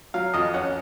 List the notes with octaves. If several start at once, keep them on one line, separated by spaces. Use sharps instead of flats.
F#3 F5
F2 D#5
C#4 F#5